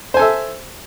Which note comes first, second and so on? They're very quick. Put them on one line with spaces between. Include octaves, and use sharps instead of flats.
C5 G#5 A4 E5